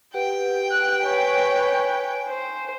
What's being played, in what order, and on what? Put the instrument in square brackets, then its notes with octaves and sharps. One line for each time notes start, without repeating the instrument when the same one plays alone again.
[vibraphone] G4 B4 F#5 [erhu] G5
[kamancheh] F#6
[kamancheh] B4 C#5 [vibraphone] G#5
[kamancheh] C5